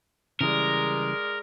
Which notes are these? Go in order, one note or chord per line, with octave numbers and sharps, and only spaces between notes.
C#3 E3 G3 G#3 A#4 D5